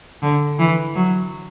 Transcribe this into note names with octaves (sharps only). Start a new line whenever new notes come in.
D3
E3
F#3